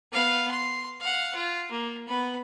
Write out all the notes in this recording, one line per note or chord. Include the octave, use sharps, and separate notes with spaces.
B3 F5
C6
F5 F#5
F4
A#3
B3 B5